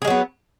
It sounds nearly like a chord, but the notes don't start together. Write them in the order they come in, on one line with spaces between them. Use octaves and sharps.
G#4 G#3 F#3 B3